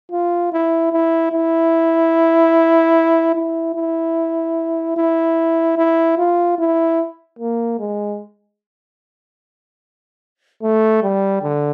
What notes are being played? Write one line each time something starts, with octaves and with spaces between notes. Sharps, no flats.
F4
E4
E4
E4
E4
E4
E4
E4
F4
E4
A#3
G#3
A3
G3
D3